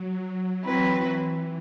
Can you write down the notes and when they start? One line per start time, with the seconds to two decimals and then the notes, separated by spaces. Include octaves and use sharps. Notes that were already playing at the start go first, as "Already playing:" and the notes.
Already playing: F#3
0.64 E3 F#3 C4 E4 B4